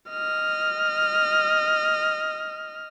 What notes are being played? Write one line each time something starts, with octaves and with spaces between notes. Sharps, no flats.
D#5 F6